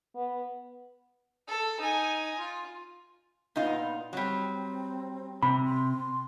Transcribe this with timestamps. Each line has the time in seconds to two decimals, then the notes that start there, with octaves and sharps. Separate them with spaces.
0.15 B3
1.48 A4
1.80 D#4 G#5
2.38 F4
3.56 A#2 B3 D#4 F4
4.13 F#3 G3 C4
5.43 C3 B5
5.65 C6